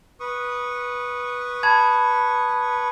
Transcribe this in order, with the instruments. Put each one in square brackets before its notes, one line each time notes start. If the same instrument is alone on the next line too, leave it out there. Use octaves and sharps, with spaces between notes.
[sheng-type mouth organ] B4 C#6 D#6
[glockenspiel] A5 B5 G#6